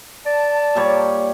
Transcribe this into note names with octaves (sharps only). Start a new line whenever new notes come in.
D5 A5
A#2 G3 C#5